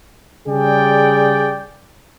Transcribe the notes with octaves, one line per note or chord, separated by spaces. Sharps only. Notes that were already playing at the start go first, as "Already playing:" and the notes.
C#3 G3 G#4 D5 G5